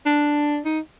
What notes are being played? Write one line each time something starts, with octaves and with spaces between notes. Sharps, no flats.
D4
D#4